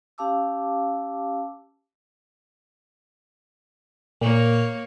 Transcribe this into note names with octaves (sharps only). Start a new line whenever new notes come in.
C#4 G4 F5 A5 D6 E6
A#2 A#3 C#5